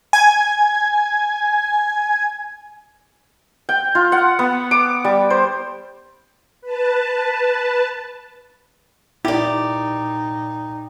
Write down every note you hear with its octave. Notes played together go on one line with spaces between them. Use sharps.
G#5 G#6
G5
F4
F#5
B3
D6
G3
C5
B4 A5
A#2 D#4 E4 G4 D5